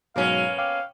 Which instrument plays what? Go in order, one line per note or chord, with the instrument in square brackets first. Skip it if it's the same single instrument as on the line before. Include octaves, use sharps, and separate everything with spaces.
[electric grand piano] G#2 B2 F#3 [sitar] A#3 B3 C#4 [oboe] F5
[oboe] F5 [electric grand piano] G5 D6